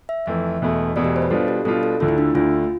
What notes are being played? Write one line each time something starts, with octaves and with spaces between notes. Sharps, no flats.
E5
F2 E3 A3 E5
E1 E2 B2 A3
E1 E2 B2 A3 D5
G4
C5
B4
B2 G3 D4 F4 A4
G4
B2 G3 D4 F4 A4
A4
D2 D3 A3 F4
E4
D4
D2 D3 A3 F4